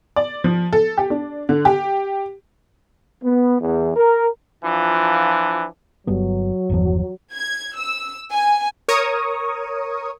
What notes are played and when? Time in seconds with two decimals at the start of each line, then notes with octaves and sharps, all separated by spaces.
0.16 D5
0.44 F3
0.73 A4
0.98 G4
1.10 D4
1.49 D3
1.65 G4
3.23 B3
3.61 E2
3.96 A#4
4.64 E3 F3 D4 F4
6.07 G1 F#3 G3 B3
6.70 G1 E2 F3
7.33 G#6
7.77 E6
8.30 G#5
8.88 A#4 C#5 C#6 D#6